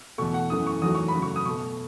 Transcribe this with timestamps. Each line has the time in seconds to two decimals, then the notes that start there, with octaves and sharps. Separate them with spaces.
0.18 E2 B2 A3 C#6
0.34 F#5
0.50 F#2 E3 A3 D#6
0.67 C#6
0.82 E2 D#3 F#3 A3 D#6
0.95 C#6
1.08 B5
1.13 F#2 C#3 F#3 A3
1.22 C#6
1.36 D#6
1.45 B2 A3 C#6